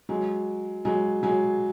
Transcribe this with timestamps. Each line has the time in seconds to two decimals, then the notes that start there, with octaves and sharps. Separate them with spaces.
0.09 F#3 G#3
0.85 F#3 G#3
1.23 F#3 G#3